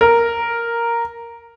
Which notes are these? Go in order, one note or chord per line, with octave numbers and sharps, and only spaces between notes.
A#4